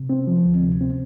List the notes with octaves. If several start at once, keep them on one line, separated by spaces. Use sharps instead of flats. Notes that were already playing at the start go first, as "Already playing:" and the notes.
Already playing: C3
C4
F3
D2
C3
C4